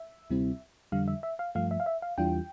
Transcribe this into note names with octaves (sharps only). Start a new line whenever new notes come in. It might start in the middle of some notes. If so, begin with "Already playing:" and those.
Already playing: E5
D2 C3 G3 C4 E4
F2 D3 G3 F5
E5
E5
F5
G2 F3 A3 F5
E5
F5
E5
F5
E2 E3 G3 D4 F4 G5